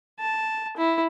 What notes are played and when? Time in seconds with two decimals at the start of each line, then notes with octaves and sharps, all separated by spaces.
0.19 A5
0.77 E4